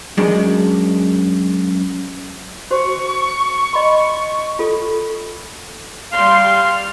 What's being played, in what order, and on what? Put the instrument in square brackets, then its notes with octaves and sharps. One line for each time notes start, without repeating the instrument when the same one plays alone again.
[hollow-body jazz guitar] F#2 G#3 D4
[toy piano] F#4 C5 [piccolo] C#6
[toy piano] D#5 B5 C6
F4 A4
[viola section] G3 C6 [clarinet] F5